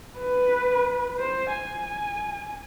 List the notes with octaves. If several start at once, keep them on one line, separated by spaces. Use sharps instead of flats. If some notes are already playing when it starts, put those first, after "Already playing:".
B4
C5
G#5